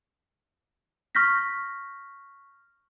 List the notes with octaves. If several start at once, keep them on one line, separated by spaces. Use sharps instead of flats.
C#6 F6 G6 A#6 B6